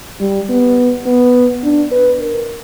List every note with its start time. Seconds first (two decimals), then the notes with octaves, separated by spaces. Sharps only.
0.21 G3
0.50 B3
1.06 B3
1.64 D4
1.91 B4
2.20 A#4